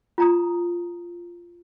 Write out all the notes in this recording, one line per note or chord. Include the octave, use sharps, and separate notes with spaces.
F4 A#5 D#6